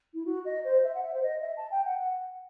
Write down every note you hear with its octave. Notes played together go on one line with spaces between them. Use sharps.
E4
F#4
D#5
C5
E5
F#5
E5
C5
D#5
E5
A5
G5
F#5
F#5